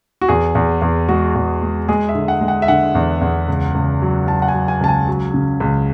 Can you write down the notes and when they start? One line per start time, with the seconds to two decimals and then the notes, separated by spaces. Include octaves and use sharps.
0.21 F#4
0.28 E2 G#4
0.55 E2
0.82 E2
1.08 G#3 F#4
1.35 E2
1.62 G#3
1.89 G#3 G#4
2.09 E5
2.15 D3
2.28 F#5
2.41 G#3
2.48 F#5
2.62 E5
2.68 D3 F#5
2.95 E2
3.21 E2
3.48 C#2
3.75 C#2
4.02 F#3
4.27 F#3 A5
4.42 F#5
4.48 G#5
4.54 F#3
4.68 G#5
4.81 C#2 A5
4.88 G#5
5.08 F#3
5.34 C#3
5.60 C#2